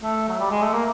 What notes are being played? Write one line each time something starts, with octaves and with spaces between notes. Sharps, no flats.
A3
F#3
G3
G#3
A3
A#3